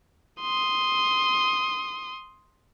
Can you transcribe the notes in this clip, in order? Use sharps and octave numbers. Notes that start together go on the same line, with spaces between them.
C6 D#6